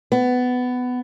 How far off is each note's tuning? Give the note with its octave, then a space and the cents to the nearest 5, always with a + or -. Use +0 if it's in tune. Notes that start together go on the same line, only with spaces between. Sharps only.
B3 +15